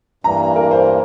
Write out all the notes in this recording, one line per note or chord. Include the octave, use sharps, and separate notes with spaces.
G2 E3 G3 A#3 A#5
A#4
C5